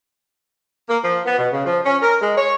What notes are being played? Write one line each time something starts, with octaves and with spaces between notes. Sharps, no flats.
A#3
F3
B3
B2
C#3
F3
C#4
A#4
G#3
C#5